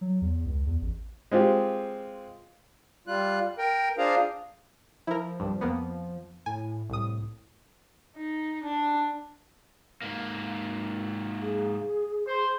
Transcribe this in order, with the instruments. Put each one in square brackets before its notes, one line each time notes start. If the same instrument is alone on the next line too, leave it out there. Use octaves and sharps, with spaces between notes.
[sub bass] F#3
E2
C#2
E2
A1
[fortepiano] G#3 C4 F4 G4
[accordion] G3 F4 F#6
A#4 G5
D4 F4 G#4 C5 F5 A#5
[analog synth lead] F3 [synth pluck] E4 A#4
[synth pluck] C2 G2
F2 A#3 B3
[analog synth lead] A2 [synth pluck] G#5
[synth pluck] C2 D#6 [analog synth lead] A2
[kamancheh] D#4
D4
[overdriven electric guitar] G#2 A#3
[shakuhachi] G#4
[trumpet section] C5